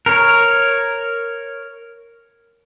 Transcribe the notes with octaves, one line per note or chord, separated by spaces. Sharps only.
A#4 C#5